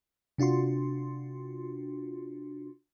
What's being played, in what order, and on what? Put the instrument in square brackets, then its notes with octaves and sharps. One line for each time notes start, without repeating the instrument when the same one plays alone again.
[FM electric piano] C3 D4 F4 F#4 C6